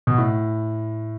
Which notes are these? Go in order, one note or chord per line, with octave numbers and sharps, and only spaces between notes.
B2
A2